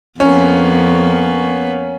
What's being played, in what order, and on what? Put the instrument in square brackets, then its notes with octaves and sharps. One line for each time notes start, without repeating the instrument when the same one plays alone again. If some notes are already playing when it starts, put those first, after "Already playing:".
[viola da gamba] F2 [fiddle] A#3 B3 [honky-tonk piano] C#4